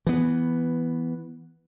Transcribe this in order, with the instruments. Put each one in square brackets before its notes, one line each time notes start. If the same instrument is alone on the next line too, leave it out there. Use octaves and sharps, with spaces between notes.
[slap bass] E3 B3